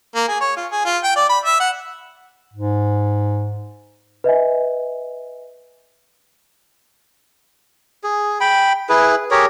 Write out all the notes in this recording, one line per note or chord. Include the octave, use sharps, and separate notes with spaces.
A#3
G#4
C#5
F4
G#4
F4
G5
D5
B5
E5
F#5
G#2
B4 D#5 E5 G#5
G#4
G5 B5
E4 G#4 B4
G4 G#4 A#4 C#5